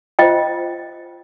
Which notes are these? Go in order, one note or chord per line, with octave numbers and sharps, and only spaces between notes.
F4 C5 D#5 G5